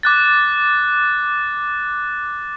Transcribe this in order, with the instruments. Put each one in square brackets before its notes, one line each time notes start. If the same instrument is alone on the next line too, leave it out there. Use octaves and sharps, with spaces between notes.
[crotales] D6 F#6 A6